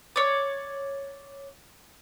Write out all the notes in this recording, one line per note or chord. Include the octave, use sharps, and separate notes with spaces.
C#5 D5